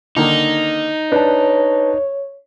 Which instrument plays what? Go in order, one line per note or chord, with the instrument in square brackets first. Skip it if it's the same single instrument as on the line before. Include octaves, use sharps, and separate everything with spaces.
[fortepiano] D3 D#3 A#3 [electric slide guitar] D#4
[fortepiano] D4 [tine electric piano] B4 A5 [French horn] C#5